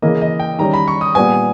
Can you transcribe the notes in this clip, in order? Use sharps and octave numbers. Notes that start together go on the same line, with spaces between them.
C#3 E3 A#3 D#5
D#5
G5
D#3 G3 C#4 A#5
B5
C#6
D#6
A#2 G3 B3 G#5